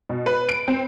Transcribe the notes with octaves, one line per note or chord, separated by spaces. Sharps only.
B2
B4
D7
C4